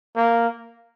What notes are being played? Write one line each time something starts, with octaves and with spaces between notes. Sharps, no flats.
A#3